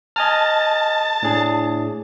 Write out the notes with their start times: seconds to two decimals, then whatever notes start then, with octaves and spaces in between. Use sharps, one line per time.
0.16 D#5 G#5 A5 F6
1.23 A2 D4 G#4